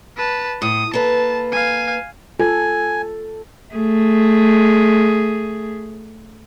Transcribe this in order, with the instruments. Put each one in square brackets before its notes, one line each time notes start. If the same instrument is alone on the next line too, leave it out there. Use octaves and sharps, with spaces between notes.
[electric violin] B4 A5
[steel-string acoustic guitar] A2 [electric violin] D#6
[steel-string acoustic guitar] A#3 A4 B4 [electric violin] A5
[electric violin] F5 G#5
[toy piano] F4 [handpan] A4 [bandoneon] G#5
[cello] A3 G#4